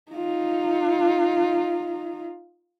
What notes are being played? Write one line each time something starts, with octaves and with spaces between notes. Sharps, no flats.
D#4 F4